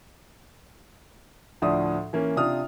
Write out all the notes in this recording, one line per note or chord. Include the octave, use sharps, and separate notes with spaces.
D2 A2 F3 D4 D#6
E3 A#3 C#4
C3 D4 F4 D#6 F6